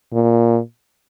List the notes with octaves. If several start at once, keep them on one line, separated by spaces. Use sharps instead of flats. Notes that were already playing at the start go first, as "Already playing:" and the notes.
A#2